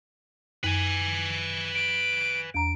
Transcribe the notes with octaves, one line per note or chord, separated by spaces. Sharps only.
F#2 B4 G#5
D7
E2 A#5 D7